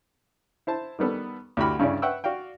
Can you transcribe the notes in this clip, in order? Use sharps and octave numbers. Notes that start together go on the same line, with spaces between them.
E4 C5 A5
D#3 G3 B3 A4
D2 E4 F#4 G4 B5 F6
G2 C#3 C#4 D4 E4 D5
B4 E5 F#5 G5 C#6 E6
F#4 D5 F5 G5